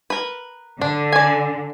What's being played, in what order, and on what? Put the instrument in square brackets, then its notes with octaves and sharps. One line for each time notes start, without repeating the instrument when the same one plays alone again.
[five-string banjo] A#4 B4
[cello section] D3 [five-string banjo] D4
[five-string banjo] D5 G#5